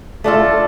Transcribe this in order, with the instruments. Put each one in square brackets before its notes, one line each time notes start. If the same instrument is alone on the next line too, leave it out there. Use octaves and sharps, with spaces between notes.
[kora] A3 D4 F4 A4